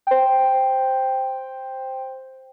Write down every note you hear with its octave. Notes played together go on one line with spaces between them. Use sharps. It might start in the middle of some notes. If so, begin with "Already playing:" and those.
C5 G5